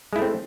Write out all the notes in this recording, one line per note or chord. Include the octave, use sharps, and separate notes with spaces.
G#3 A3 C4 E4